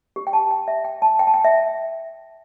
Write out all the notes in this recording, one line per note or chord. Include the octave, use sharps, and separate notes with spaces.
G4
G5
A5
G5
E5
G5
A5
G5
A5
G5
E5